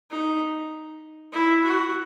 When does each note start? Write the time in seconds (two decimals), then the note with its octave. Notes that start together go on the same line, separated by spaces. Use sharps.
0.11 D#4
1.33 E4
1.64 F#4